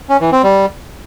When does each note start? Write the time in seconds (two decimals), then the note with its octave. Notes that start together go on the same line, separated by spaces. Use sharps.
0.09 C#4
0.21 E3
0.32 C4
0.43 G3